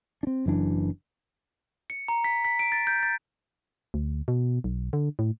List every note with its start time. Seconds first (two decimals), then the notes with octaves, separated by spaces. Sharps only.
0.23 C4 D4
0.46 F#1 F#2 E3 D4
1.90 C#7
2.08 A#5
2.24 B6
2.45 B6
2.59 D7
2.72 A6
2.87 G6
3.03 A6
3.94 D2
4.28 B2
4.64 B1
4.93 D3
5.19 A2